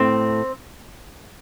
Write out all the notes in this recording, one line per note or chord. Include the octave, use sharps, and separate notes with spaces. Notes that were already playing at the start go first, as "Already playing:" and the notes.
Already playing: A2 A3 C4